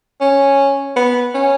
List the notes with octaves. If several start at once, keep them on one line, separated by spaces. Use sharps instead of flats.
C#4
B3
C#4